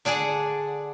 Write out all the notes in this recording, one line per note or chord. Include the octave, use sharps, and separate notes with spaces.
D3 D4 G#4 D5 F#5